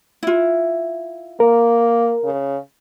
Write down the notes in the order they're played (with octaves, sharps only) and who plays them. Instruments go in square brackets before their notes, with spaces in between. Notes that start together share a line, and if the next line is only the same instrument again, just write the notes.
[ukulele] E4 F4
[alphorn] A#3 [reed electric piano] A#4
[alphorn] C#3